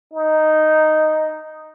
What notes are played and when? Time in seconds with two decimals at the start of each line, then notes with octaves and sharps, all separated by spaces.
0.14 D#4